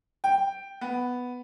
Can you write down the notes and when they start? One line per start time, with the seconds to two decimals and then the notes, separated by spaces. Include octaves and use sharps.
0.24 G5
0.81 B3